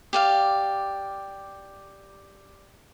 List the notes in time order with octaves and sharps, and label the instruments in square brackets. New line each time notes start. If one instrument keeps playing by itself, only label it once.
[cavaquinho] G4 D5 F5